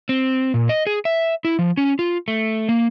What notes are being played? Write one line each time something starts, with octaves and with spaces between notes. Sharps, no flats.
C4
A#2
D#5
G#4
E5
E4
F3
C#4
F4
A3
A#3